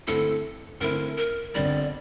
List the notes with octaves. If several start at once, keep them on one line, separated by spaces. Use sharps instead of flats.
G2 D3 A3 C4 E4 A4
G2 D3 A3 C4 E4 A#4
A#4
G1 F2 D3 G3 D5